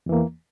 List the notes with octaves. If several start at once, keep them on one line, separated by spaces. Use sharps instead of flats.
E2 E3 A#3